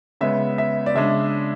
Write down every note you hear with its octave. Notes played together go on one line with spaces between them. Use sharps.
C#3 G#3 B3 E5
E5
D5
C#3 G#3 D4 E5